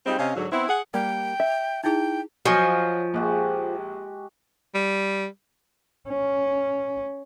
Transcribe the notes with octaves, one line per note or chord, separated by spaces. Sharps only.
G3 G#3 C4 D#4 F4
C3 C#4 D#5 F5
G#2 D3 F#3
B3 C4 E4
G#4 F#5
G3 A#3 G5
E5
D#4 E4 G#4 G5
F3 F#3 D#5 G#5 C#6
A#1 G#3 F#4 G4
G3
C#4